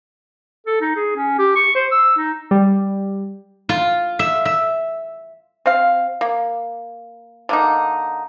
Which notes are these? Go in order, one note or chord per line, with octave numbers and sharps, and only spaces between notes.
A4
D#4
G#4
C#4
G4
C#6
C5
E6
D#4
G3
F4
E5
E5
C4 F5
A#3
D3 A#3 D#4